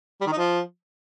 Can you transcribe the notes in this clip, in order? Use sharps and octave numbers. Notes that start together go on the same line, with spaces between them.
G3
D#3
D#4
F3